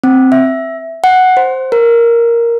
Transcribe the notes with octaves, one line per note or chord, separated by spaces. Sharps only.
C4
E5
F#5
C5
A#4